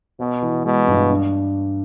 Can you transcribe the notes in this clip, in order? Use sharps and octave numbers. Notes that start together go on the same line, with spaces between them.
B2 B3
E3
B2 G#3
G2
D4